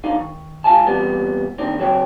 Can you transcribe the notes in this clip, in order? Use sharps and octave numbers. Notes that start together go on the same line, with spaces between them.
B1 D3 D#4 F5
D#3
C#2 F4 F5 G#5 A5
E2 A#2 G3 B3 C4
D#3 A#3 C4 D4
C#3 F#3 C4 C#5 G5